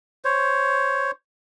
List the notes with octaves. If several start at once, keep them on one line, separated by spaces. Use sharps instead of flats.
C5 C#5